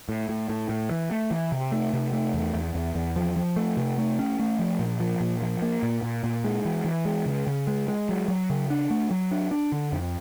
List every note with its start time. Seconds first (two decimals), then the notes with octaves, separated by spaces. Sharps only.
0.09 A2
0.29 A2
0.49 A2
0.69 A2
0.91 E3
1.11 A3
1.31 E3
1.52 C3
1.72 A3
1.93 C3
2.13 A3
2.34 E2
2.54 E2
2.75 E2
2.95 E2
3.16 F3
3.36 F3
3.56 A3
3.77 C3
3.98 A3
4.19 C#4
4.39 A3
4.59 F3
4.79 A#2
5.00 F3
5.20 A#2
5.42 F3
5.62 A#3
5.83 A#2
6.03 A#2
6.24 A#2
6.44 G#3
6.65 E3
6.85 E3
7.05 G#3
7.26 C#3
7.47 C#3
7.67 G#3
7.88 G#3
8.09 F#3
8.28 F#3
8.50 C#3
8.70 D4
8.90 A3
9.11 F#3
9.31 D4
9.51 D4
9.72 D3
9.92 F2